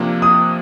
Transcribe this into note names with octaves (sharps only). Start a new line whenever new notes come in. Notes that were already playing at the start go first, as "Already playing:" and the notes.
Already playing: C3 F3 A#3 D4
D#6